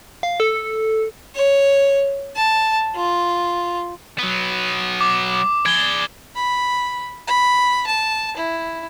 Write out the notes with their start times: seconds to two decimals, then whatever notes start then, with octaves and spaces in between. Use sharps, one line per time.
0.23 F5
0.40 A4
1.35 C#5
2.36 A5
2.96 F4
4.19 F#3 B3
5.01 D6
5.66 G#4 D5 G#6 G7
6.36 B5
7.27 B5
7.87 A5
8.37 E4